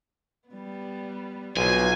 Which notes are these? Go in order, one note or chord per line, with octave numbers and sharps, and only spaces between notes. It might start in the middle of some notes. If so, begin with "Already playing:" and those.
G3 B3
B1 F4 C5 G#5